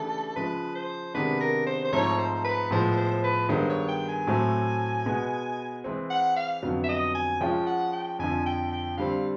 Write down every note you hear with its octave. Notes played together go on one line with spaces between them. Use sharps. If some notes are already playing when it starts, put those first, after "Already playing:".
Already playing: C#3 E3 A3 D4 G4 A4
C#3 F3 G#3 B4
C5
C3 D#3 G#3 B3 D4 B4
A#4
C5
C5
G#2 F3 A3 C4 D#4 C#5
C5
B4
A2 F3 G#3 B3 C5
C5
B4
G2 D#3 G#3 B3 C5
C#5
G5
G#5
A2 F#3 A3 C4
B2 G#3 B3
E3 G#3 C4
F#5
F5
F2 D3 F#3 B3
E5
D#5
G#5
F3 G#3 C#4 F4 G5
F#5
G5
F2 D3 F3 G#5
G5
G5
D3 G3 C4 F5